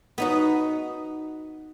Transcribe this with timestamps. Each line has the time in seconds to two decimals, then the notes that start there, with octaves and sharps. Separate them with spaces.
0.18 B3 D#4 F#4